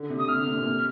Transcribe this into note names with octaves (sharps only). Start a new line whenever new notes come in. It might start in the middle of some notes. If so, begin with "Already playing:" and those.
Already playing: D3
C3
D#6
C3 F6
D3
C3
A#2
C3